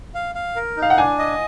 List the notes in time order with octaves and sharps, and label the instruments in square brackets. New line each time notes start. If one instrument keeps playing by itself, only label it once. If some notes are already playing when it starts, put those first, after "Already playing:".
[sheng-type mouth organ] F5
F5
A#4
D#4
[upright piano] F5
F#5
[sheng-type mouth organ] D4 [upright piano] G#5
[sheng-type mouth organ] D#5